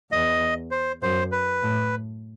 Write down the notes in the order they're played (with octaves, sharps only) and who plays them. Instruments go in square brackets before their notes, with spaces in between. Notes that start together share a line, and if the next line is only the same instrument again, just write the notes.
[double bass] E2 [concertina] D#5
[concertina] C5
[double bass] F#2 [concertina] C5
[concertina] B4
[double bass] A2